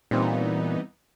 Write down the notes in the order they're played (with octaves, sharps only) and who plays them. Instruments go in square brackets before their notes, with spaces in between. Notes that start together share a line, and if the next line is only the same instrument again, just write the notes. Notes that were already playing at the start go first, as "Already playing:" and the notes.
[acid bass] A#2 [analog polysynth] E3 B3 D#4 [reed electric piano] G3 C4